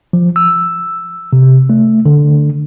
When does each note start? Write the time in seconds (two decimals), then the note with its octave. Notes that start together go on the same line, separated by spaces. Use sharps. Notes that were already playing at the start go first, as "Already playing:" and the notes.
0.13 F3
0.36 E6
1.33 C3
1.70 A3
2.06 D3